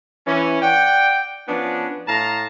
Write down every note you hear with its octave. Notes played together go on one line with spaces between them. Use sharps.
E3 C#4
D5 F#5 G5
F3 B3 C#4 D4
A2 F5 A5 A#5